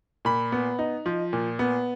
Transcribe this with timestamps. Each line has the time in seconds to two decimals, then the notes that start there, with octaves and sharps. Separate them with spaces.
0.25 A#2 B5
0.52 B3
0.79 D#4
1.06 F3
1.33 A#2
1.59 B3